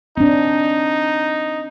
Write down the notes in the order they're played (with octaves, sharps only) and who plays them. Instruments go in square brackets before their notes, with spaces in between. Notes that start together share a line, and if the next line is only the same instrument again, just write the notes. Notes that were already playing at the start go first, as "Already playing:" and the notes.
[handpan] C4 D4 [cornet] D#4